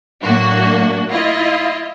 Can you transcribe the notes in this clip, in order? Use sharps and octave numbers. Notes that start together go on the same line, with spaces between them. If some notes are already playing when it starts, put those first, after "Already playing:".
A2 F#3 A#3 D4 F#4
E4 F4 D#5